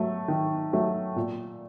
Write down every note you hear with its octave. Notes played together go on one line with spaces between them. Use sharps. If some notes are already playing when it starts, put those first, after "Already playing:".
Already playing: F#3 A3
D#3
F#3 A3
A#2